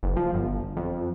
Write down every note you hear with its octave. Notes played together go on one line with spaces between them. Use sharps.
F#1
F3
G1
F2